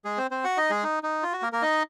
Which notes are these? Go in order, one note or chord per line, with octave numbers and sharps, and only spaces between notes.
G#3 G#4
C4 C5
C4 C5
F#4 F#5
D#4 D#5
G#3 G#4
D#4
D#4
F4
F#4
A#3 A#4
A#3 A#4
D#4 D#5